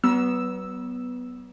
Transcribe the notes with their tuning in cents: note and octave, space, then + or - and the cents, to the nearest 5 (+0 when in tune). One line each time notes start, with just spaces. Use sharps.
F#3 +45 B3 +0 E6 +0